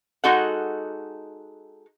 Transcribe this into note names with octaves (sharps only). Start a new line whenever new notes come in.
G#3 D#4 F#4 A4 F#5